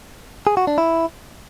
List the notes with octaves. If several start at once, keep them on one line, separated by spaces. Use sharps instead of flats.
G#4
F#4
D4
E4